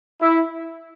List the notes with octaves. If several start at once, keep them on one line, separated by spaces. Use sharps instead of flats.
E4